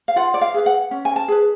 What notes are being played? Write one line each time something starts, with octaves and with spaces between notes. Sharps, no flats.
F5
F4 F#5
D5
F5
G#4 B4 F5
F#5
C#4
G#5
A5
G#4 B4